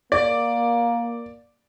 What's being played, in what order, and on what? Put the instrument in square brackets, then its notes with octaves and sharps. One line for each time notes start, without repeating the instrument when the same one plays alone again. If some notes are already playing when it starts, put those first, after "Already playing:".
[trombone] A#3 [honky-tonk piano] D5